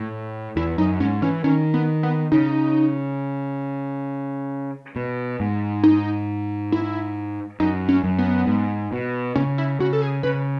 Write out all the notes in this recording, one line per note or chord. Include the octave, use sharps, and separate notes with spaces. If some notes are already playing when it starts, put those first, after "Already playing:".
Already playing: A2
E2 E4
F#2 D#4
G#2 C#4
E3 C#4
D#3 C#4
B3
B3
C#3 D#4
B2
G#2
D#4
E4
F#2 D#4
C#4
F#2
B3
G#2
B2
C#3 C#4
E4
C#3 F#4
A4
G#4
C#3 B4